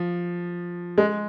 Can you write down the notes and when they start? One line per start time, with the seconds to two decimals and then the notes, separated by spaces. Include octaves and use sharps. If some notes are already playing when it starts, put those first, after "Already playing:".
Already playing: F3
0.98 G#3